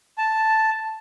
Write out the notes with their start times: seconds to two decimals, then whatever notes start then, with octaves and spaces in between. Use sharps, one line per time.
0.18 A5